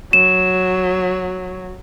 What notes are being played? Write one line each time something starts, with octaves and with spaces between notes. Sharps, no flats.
F#3 E7